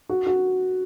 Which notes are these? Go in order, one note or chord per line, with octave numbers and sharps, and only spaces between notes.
F#4
F#4